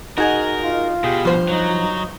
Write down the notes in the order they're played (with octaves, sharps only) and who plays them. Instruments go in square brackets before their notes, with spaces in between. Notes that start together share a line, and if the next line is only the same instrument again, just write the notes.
[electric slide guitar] D#4 [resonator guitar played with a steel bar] F#4 G#4 D#5 [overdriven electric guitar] A#4
[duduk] F4
[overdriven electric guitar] B2 [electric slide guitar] G4 G#4
[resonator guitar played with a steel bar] G2 C5 F5 [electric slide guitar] F3
[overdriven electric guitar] F#3 [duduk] D#4